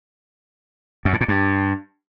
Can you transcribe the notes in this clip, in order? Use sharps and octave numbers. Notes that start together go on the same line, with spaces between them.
F#2
A2
A#2
G2